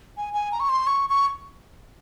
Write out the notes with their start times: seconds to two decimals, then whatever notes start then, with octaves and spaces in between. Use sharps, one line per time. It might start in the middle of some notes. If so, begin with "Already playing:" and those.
0.17 G#5
0.33 G#5
0.52 A#5
0.60 C#6
0.69 C6
0.87 C#6
1.10 C#6